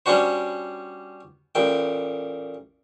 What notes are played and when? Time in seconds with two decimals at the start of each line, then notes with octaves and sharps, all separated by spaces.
0.06 G3 B3 C#4 D4 F#4 C5
1.55 A1 A#2 G5